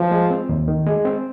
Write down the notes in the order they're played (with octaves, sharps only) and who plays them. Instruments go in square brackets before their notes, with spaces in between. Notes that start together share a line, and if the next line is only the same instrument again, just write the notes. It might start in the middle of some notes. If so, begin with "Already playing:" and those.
Already playing: [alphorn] F3
[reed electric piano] G#3
C4
D#2
D#3
G#3
C4